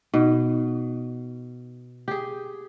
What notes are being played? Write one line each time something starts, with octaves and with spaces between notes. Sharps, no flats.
B2 D#4
G4 G#4